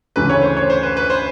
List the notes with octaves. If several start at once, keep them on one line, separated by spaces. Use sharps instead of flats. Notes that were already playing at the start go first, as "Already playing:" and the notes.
D2 C#3 E3 A3 B4
C#5
C5
C#5
C5
B4
B4
C5